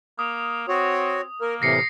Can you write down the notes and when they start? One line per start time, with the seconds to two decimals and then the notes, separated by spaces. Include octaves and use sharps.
0.19 A#3 D#6
0.68 C4 F#4 C#5
1.41 A#3 A#4
1.62 A2 C3 E3 A#6 C7 C#7